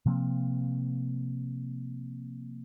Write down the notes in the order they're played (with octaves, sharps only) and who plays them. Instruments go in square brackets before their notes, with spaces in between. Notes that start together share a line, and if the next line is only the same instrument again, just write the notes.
[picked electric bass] C3 F3 A#3 C4